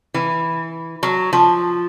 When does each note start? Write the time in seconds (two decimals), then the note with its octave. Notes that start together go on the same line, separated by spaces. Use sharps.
0.14 E3
1.03 F#3
1.33 F3